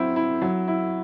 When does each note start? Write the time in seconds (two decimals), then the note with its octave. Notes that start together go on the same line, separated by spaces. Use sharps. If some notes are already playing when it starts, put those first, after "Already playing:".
Already playing: F#3 C4 E4
0.16 E4
0.42 F#3
0.68 E4